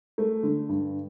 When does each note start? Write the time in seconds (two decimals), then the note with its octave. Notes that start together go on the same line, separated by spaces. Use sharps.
0.18 A3
0.43 D3
0.69 G2